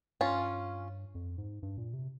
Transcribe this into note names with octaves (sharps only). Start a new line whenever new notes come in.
G2 C#4 F4
F2
G#2
G2
A#2
C3